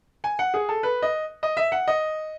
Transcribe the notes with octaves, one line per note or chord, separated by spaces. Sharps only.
G#5
F#5
G#4
A4
B4
D#5
D#5
E5
F#5
D#5